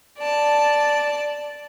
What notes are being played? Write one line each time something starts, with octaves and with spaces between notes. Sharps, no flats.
D5 A5